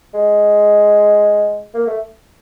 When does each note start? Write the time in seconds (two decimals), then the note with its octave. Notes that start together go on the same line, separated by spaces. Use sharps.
0.14 G#3
1.74 A#3
1.87 A3